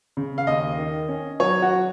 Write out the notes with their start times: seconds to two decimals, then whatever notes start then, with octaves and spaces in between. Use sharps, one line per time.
0.17 C#3
0.38 F5
0.47 D#2 D#5
0.78 D#3
1.09 C#4
1.40 F#3 C#5
1.62 F#4